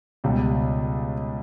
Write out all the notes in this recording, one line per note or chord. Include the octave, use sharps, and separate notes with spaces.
C#2 B2 G3